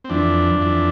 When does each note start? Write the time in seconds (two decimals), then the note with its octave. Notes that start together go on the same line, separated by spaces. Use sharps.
0.04 C4
0.10 F2 E3 D4
0.60 F2 E3